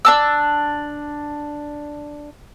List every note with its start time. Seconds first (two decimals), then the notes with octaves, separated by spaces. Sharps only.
0.05 D4 A5 E6